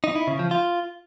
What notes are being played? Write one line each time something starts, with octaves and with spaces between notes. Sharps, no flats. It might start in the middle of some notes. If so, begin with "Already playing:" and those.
D#4
E4
C#3
F3
F4